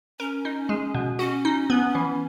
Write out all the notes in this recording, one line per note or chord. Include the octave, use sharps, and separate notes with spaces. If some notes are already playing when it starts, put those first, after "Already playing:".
C#4 A#4
D#4
G#3
B2
C#4 F#4
D#4
B3
E3